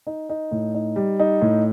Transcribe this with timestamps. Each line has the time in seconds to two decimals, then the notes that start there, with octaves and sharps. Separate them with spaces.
0.07 D#4
0.30 D#4
0.52 A2
0.75 D#4
0.96 G3
1.20 D#4
1.42 A2